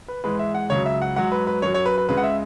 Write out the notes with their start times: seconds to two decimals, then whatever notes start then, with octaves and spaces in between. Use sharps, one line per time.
0.08 B4
0.24 G#2 E3 G#3 B4
0.39 E5
0.54 F#5
0.70 C#2 C#3 F#3 C#5
0.86 E5
1.02 F#5
1.16 G#2 F#3 F#5
1.32 B4
1.47 B4
1.62 F#2 F#3 C#5
1.74 C#5
1.86 B4
1.98 B4
2.09 C#2 C#3 G#3 B4
2.17 F#5
2.24 E5